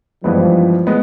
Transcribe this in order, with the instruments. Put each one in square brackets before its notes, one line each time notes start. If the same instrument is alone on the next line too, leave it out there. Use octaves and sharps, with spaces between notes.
[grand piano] G2 E3 G#3 B3 [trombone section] F3
[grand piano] G#3 B3